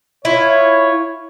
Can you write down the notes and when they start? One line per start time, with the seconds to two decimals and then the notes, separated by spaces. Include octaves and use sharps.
0.25 E4 F4 C#5